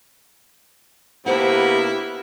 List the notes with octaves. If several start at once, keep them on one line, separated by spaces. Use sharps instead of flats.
C3 A#3 B3 D4 E4 G4 C5 F#5